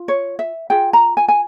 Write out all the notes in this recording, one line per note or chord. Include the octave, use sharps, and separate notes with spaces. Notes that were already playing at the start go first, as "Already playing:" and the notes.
Already playing: F4
C#5
E5
F4 G#4 G5
A#5
G#5
G#5